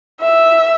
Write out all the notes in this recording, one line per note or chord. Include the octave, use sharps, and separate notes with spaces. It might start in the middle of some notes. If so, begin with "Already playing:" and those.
E5